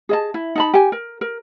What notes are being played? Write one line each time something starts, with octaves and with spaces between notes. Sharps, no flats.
G#4 D#5 A5
E4
D#4 A5 B5
G4 G#5
A#4
A#4